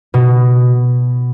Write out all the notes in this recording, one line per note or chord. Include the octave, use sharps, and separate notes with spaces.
B2